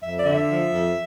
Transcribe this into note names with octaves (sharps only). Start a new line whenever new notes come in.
F2 E5
D5
D3 E5
F3
F2